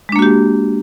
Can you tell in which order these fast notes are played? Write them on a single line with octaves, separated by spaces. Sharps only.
G#3 D4 A#3 F#4 G4